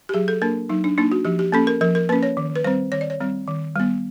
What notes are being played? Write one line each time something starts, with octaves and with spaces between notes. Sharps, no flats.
G4
F#3 G#4
A4
A#3 D4 A#4
F#3 D#4
D4
A#3 D4 D#4
F#4
F3 G4
G4
A#3 C#4 A4
A#4
F3 A#4
A#4
A#3 C#4 B4
C#5
D#3
B4
G3 C4 C5
D#3 C#5
D5
C#5
G3 C4
D#3
G3 B3